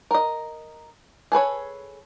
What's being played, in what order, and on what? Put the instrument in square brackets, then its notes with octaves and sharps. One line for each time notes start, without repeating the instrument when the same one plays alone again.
[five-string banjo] A#4 D#5
G#4 A4 B4 C#5